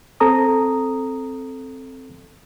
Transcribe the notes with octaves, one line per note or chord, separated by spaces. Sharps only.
C4 A4 A#5 D#6